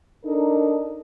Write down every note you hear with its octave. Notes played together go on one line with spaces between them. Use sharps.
D4 D#4 A4 A#4